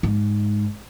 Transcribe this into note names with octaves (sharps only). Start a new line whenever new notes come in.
G#2